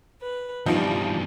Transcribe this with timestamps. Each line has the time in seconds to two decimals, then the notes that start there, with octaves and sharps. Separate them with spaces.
0.21 B4
0.66 E2 G2 E3 F3 G3 D#4